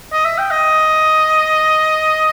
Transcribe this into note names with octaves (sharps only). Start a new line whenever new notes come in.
D#5
E5
G5
D#5